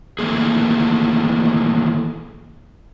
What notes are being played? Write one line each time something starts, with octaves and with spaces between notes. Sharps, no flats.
D#3 E3 A3 A#3 G#4